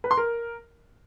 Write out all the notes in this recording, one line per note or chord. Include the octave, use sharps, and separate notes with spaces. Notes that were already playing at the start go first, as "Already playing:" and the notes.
B4
C6
A#4